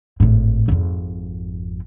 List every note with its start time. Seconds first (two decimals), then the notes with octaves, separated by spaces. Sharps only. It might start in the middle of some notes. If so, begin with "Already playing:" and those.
0.20 G#1 A2
0.68 G#1 F2